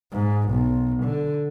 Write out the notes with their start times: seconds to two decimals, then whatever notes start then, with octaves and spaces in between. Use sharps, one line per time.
0.12 G#2
0.50 B1
1.04 D3